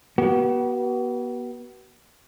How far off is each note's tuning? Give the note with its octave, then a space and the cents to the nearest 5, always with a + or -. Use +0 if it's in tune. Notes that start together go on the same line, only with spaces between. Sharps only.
B3 -35 F#4 +40